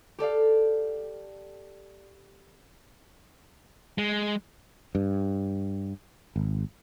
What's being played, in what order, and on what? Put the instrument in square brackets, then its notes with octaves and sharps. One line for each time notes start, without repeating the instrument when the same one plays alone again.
[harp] G4 A4 D5 F5
[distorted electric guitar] G#3
[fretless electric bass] G2
G#1